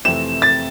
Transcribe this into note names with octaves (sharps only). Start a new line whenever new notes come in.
F2 C3 E3 A3 C4 E7
A6